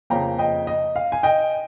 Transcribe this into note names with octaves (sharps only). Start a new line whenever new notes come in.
F2 C#3 F3 A#3 G5 A#5
D#5 G5
D#5
F5
G#5
D#5 G5